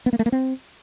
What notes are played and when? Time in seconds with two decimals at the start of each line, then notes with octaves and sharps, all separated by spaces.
0.06 B3
0.13 A#3
0.19 A3
0.26 A#3
0.32 C4